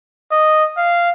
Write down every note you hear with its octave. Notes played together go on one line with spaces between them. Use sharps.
D#5
F5